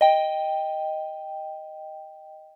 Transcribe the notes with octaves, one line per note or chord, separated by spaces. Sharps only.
D#5 G5